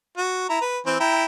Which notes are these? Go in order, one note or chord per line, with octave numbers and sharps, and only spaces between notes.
F#4
E4 A#5
B4
E3 C4
E4 G5 A#5